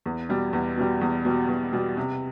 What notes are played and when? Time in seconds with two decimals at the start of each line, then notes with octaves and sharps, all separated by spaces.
0.06 E2
0.29 B2 G3
0.53 E2
0.78 B2 G3
1.01 E2
1.25 B2 G3
1.48 E2
1.73 B2 G3
1.97 C3